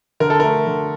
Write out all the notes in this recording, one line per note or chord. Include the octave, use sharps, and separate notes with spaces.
D3 A#4
A4
A3 A#4
D3